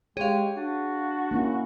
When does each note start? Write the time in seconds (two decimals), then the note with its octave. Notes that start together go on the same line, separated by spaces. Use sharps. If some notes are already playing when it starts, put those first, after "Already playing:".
0.17 G#3 G4 G#4 C#5 F5
0.56 D4 F#4
1.31 A#3 C#4 E4